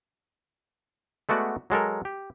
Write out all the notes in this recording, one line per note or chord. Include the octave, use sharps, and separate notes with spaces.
G#3 A3 B3 F#4 D5
F#3 G#3 A4 A#4
G4